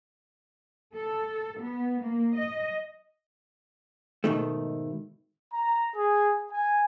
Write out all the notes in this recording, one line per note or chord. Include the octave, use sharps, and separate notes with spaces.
A4
B3
A#3
D#5
G#2 B2 D#3 A3
A#5
G#4
G#5